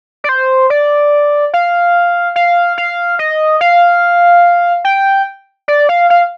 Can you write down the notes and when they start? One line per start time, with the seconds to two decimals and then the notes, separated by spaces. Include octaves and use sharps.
0.24 D5
0.29 C5
0.70 D5
1.54 F5
2.36 F5
2.78 F5
3.19 D#5
3.61 F5
4.85 G5
5.68 D5
5.89 F5
6.10 F5